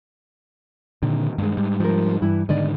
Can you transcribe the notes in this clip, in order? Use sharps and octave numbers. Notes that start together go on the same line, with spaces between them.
A#2 D3 D#3
G2 G#3
G#2 G3
F3 A#4
G2 E3 E4
G#2 D3 D#3 D5 D#5